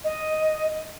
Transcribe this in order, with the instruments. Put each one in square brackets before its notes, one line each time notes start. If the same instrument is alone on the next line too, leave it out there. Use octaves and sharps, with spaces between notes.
[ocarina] D#5